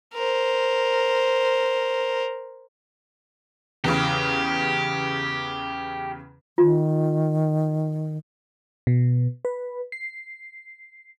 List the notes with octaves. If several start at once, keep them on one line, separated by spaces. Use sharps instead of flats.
A#4 C5
E2 C#3 G4
D#3 F4
B2
B4
C7